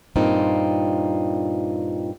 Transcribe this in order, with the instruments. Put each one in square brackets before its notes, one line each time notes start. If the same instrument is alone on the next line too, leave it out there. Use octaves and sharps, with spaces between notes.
[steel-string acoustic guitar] G2 A#2 C4 D#4 F4